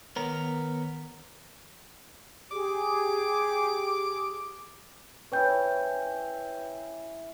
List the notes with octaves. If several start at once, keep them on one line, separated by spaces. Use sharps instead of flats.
D#3 B3 A#4 C#5
G4 G#4 D6
C#4 E4 B4 G5 G6